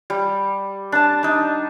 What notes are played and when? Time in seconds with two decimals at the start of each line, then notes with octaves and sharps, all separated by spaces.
0.10 G3
0.92 D4 A5
1.23 D4 D#4